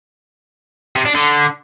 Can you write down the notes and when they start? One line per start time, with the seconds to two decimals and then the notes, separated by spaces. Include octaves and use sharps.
0.96 C3
1.05 D4
1.15 D3